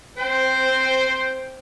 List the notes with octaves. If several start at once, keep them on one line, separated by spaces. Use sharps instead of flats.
C4 C5 G5